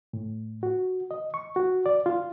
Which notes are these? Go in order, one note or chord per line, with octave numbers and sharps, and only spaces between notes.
A2
F#4
D#5
C#6
F#4
D5
F4